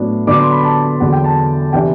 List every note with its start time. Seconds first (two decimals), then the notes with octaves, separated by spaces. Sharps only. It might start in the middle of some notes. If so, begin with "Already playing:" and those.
Already playing: A2 F#3 B3 D4
0.27 D3 F#3 B3 D4 D6
0.40 C6
0.52 B5
0.64 A5
1.00 E2 D3 F#3 F#5
1.12 G5
1.24 A5
1.73 C3 E3 B3 D4 G5